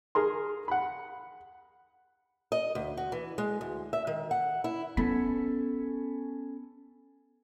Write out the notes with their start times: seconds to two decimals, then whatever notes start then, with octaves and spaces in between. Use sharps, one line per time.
0.15 G#4 A#4 C6
0.68 F#5 B5
2.52 D#5
2.75 D2
2.97 F#4
3.12 E3
3.38 G#3
3.61 D2
3.93 E5
4.07 D#3
4.31 F#5
4.64 E4
4.97 B3 C#4 A4 B5